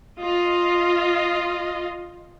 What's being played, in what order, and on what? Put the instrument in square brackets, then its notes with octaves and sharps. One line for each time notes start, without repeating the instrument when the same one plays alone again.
[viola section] F4 D#5